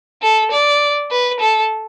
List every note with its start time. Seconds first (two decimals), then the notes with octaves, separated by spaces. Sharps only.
0.22 A4
0.51 D5
1.11 B4
1.40 A4